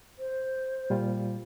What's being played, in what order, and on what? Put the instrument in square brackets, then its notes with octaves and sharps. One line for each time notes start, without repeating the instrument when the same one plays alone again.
[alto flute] C5
[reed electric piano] A#2 G3 F4